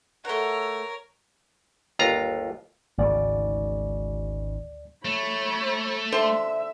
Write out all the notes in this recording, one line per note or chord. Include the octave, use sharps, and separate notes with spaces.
A3 A#4 C#5 F#5
G1 D#2 F4 A#5
G#1 D2 G#2 C#3 D5
A3 C#5 B5
D3 C5 E5 C6